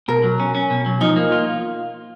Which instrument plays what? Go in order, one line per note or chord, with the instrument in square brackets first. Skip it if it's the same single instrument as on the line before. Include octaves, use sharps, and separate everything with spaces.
[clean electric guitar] B2 [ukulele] A#4
[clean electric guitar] F#3
C#4
C#4
B2
F#3
[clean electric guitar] F3 [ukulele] D#4
[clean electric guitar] A#3
F4